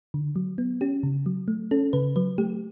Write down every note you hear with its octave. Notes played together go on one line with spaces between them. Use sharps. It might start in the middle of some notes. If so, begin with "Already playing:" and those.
D3
F#3
B3
C#4 G4
C#3
F#3
A3
C#4 A4
C#3 B4
F#3 B4
A3 G4